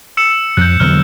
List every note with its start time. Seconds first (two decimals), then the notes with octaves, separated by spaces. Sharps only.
0.17 E6 C#7 E7
0.57 F2 F#6 G6
0.80 E1 D3 F#3 F6